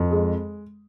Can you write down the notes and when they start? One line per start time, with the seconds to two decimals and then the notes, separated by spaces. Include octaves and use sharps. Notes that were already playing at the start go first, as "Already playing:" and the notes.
Already playing: F2
0.11 G#3